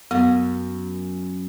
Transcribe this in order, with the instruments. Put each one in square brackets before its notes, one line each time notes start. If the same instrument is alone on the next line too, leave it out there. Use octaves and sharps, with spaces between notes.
[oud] F#2 [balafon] B3